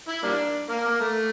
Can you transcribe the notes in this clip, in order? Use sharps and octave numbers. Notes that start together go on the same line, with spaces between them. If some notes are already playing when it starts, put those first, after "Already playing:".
E4
G3 A#3 D4
A#3
A#3
A3